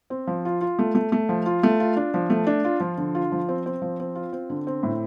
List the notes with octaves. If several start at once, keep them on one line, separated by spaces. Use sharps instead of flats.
C4
F3
F4
F4
A3
A3
A3
F3
F4
A3
F4
D4
F3
A3
D4
F4
F3
D3
F4
F3
C4
C4
F3
C4
F4
C4
D3
C4
A2